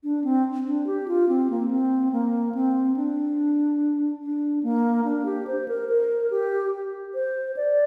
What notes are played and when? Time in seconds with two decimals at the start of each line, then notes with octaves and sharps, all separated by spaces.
0.04 D4
0.24 C4
0.66 D4
0.87 G4
1.08 F4
1.29 C4
1.50 A#3
1.71 C4
2.12 A#3
2.55 C4
2.96 D4
4.22 D4
4.63 A#3
5.05 D4
5.26 G4
5.47 C5
5.68 A#4
5.89 A#4
6.31 G4
7.14 C5
7.57 D5